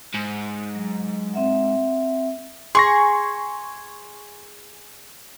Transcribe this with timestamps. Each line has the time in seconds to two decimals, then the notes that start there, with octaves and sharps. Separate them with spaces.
0.14 G#2
0.75 F#3
1.33 C4 E5 F#5
2.75 G#4 C6 C#6 A#6